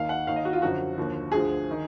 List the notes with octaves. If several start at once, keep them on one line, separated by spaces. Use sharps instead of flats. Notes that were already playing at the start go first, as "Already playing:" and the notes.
Already playing: D#2 D#3 F5
F#5
D#2 D#3 F5
D#5
F#4
F4
F#2 D3 F3 F#4
D#2 D3 F3
D2 D3 F3 G#4
D#3